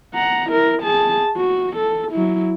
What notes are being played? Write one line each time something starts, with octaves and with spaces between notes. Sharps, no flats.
F#5 A#5
E4 A#4
G#4 A5
F#4
A4
F#3 E4